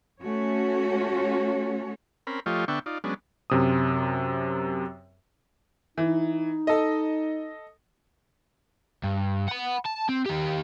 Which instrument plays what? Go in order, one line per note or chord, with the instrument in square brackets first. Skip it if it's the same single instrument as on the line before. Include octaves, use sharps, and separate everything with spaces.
[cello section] A3 C#4 F#4 C#5
[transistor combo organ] C4 C#4 A#4 B5
F3 A3 F4 G4 C#5 D#5
D3 B3 D4 E5 G5 C#6
D#4 F4 D5
F#3 G#3 B3 C#4 D4
[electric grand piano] F#2 C3 D#6
[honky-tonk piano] E3 [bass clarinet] D#4
[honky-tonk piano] A4 D#5
[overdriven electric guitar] G2
F#5 B5
A5
C4
D#3 G4